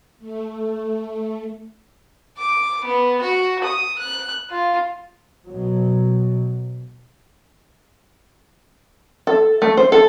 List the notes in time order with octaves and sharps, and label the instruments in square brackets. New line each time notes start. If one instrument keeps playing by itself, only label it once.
[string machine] A3
[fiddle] D6
B3
F#4
D#6
F#6
F4
[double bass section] B2 F#3
[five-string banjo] A4
A3
C5
A4